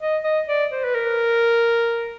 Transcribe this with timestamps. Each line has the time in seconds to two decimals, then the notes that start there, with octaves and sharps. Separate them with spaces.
0.01 D#5
0.24 D#5
0.48 D5
0.72 C5
0.84 B4
0.95 A#4